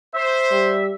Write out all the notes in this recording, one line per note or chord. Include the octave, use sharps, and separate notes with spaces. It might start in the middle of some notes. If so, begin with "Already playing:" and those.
C5 E5
G3